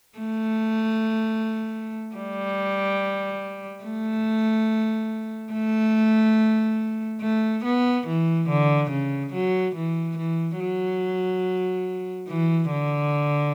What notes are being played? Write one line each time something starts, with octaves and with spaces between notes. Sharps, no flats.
A3
G3
A3
A3
A3
B3
E3
D3
C#3
F#3
E3
E3
F#3
E3
D3